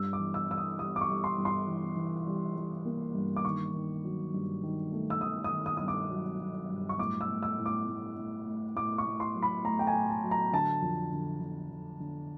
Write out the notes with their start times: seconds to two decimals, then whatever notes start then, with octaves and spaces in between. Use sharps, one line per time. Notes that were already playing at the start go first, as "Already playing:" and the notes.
Already playing: G2 E6
0.13 D6
0.19 E3
0.34 E6
0.49 E3 E6
0.57 D#6
0.79 G3 D#6
0.96 D6
1.01 C#6
1.09 G3
1.24 C6
1.38 G2
1.45 C6
1.67 E3
1.96 E3
2.27 G3
2.56 G3
2.85 A#3
3.15 G2
3.36 D6
3.45 D#3 C#6
3.74 D#3
4.04 F#3
4.34 G2
4.63 D#3
4.92 A3
5.10 E6
5.21 D#3 D#6
5.44 D#6
5.52 D#3
5.66 D#6
5.77 G2 D#6
5.88 D6
6.10 F#3
6.40 F#3
6.70 G2
6.89 C#6
6.99 A2 D6
7.21 E6
7.28 A2
7.43 E6
7.58 A2
7.66 D6
7.87 A2
8.17 A2
8.47 A3
8.76 A2 D6
8.98 C#6
9.06 A2
9.20 C6
9.34 F#3
9.43 B5
9.64 A3 A#5
9.79 G5
9.87 G#5
9.94 A2
10.09 A5
10.23 F#3
10.31 A#5
10.53 D3 A5
10.82 F2
11.12 D3
11.41 D3
11.71 D3
12.00 D3